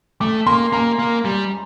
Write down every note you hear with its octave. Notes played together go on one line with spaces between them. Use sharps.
A3 D6
A#3 C6
A#3 A#5
A#3
G3